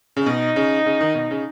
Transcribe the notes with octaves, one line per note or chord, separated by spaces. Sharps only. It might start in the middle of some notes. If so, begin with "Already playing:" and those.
C#3
B2 D#4
C#3
C#3
D#3
B2
C#3